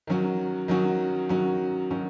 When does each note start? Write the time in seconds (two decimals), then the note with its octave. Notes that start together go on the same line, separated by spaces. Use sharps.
0.07 D#3 F#3 C#4 F#4
0.68 D#3 F#3 C#4 F#4
1.29 D#3 F#3 C#4 F#4
1.91 D#3 F#3 C#4 F#4